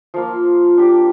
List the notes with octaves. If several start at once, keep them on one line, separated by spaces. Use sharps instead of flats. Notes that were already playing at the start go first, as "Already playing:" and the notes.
F3 A#3 F4
D4 G4 D5